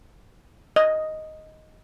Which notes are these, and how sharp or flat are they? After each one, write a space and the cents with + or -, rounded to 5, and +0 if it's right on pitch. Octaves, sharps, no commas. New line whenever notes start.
D#5 +5